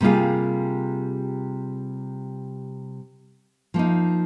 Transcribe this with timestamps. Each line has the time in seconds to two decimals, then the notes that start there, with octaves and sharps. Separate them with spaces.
0.01 C3 G3 A#3 F4 G#4
3.74 F3 A#3 D#4